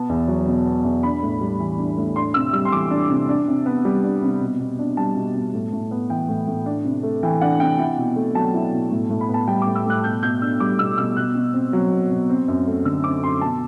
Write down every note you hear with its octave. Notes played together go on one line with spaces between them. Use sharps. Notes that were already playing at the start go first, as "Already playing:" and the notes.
Already playing: B2 B3 A5
E2
F#3
B2
B3
E2
D4 B5
A2
G3
E3
D4
A2
D4 C6
C3 E6
G3 E6
C6
E3 D6
D4
C3
D4
C3
B3
G3
D4
C3
B2
B2
D4
G3 A5
B2
B2
A2
A2
B3
E3 G5
A2
A2
D4
C3
A3
E3 G5
D4 F#5
C3 G5
E4
B2
A3
F#3 A5
E4
B2
A2
A2
B5
B3
A5
G3 G5
D6
A2
E6
A2 F#6
B2 G6
B2 G6
D4 E6
G3 D6
B2 E6
B2 E6
B2 F#6
B2
C4
F#3
B2
B2
C4
F#2
A3
D3 E6
C4 D6
F#2 C6
B2 A5